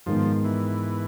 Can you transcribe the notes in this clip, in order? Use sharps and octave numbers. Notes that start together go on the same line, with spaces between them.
G#2 D#3 F3 G#3 B3
E3